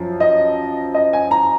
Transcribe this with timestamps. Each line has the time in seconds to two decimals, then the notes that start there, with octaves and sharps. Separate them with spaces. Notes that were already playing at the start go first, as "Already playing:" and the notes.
Already playing: F#2 F3
0.20 D#5
0.94 D#5
1.13 G#5
1.31 A#5